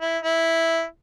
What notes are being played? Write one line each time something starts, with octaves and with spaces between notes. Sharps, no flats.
E4
E4